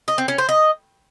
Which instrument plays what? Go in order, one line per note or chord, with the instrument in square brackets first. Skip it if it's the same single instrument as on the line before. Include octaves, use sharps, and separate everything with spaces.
[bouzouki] D#5
C4
C#4
C5
D#5